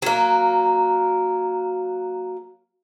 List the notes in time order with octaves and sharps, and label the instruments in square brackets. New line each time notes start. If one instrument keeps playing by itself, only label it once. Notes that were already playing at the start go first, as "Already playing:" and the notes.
[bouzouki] F#3 A#3